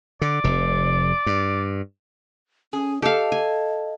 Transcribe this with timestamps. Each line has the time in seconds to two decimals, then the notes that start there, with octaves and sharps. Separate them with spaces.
0.21 D3 D5
0.44 F1 C3
1.26 G2
2.73 C#4 G#4
3.02 G4 A4 D#5 F5
3.32 G#5